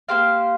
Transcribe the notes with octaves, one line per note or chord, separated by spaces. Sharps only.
A#3 G4 C5 F5